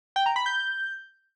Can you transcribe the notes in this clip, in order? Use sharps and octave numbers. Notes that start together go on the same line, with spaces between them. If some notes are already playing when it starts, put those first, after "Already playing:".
G5
A#5
B5
G6